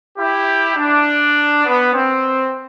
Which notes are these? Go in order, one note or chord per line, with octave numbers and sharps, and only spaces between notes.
E4 G4
D4
B3
C4